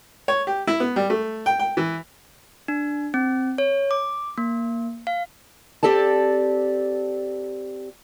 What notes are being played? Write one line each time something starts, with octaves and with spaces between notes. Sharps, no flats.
C#5
G4
E4
B3
G3
A3
G5
G5
E3
D4
C4
C#5
D6
A#3
F5
C4 G4 A4 D5 A5